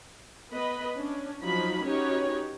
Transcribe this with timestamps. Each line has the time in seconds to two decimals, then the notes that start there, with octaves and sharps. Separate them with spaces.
0.51 B3 B4 D#5 B5
0.97 C#4 D4
1.44 F3 F#3 D#4 F#4 B5
1.85 C#4 D#4 F#4 G4 B4 C#5